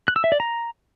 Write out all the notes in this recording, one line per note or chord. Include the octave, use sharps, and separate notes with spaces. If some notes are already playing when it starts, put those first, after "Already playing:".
F#6
E6
E5
D5
A#5